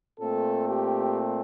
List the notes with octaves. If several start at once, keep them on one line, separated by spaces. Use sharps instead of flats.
A#2 A3 C4 A4
G4